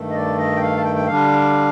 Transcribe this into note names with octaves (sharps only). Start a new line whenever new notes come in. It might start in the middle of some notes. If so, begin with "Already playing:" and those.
Already playing: G2 D#3 A3
D#5
D5
D#5
G5
F5
A5
G5
G5
D3 G3 D4 F5